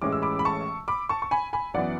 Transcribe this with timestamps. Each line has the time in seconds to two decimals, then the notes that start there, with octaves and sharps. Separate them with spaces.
0.02 A1 A2 E3 G#3 C#4 D6
0.12 E6
0.22 B5 D6
0.39 B5
0.45 A5 C#6
0.88 B5 D6
1.09 A5 C#6
1.22 C#6
1.31 G#5 B5
1.53 G#5 B5
1.74 F#2 E3 B3 D5 F#5